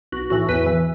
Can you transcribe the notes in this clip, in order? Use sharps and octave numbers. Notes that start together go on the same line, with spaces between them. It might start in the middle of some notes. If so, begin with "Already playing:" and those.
B1 F#4
A2 E3 F#4
E2 B4
E3